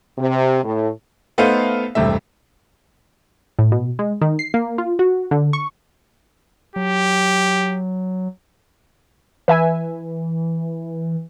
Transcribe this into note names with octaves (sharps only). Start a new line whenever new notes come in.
C3
A2
A3 B3 D#4 A4 C5 F5
E1 G2 C3 A3 E5
A2
B2
G#3
D#3
C7
A#3
F4
F#4
D3
C#6
F#3 G4
E3 B4 E5 G#5